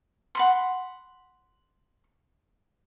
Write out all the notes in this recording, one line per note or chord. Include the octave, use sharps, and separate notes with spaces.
F#5 B5 C6